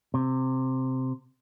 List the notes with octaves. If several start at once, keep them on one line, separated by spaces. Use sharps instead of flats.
C3